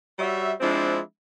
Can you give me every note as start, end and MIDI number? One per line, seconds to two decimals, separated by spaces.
0.19 0.52 55
0.19 0.52 66
0.19 0.52 73
0.19 0.52 76
0.60 1.00 53
0.60 1.00 56
0.60 1.00 60
0.60 1.00 62
0.60 1.00 64